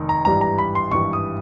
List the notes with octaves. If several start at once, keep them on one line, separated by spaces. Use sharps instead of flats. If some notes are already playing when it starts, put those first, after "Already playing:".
Already playing: F1 D#3
A#5
G#1 G2 E3 G3 A#5
A#5
B5
C6
G#1 G2 E3 G3 C#6
D#6